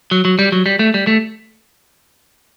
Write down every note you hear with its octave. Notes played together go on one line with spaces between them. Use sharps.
F#3
F#3
G3
F#3
G3
A3
G3
A3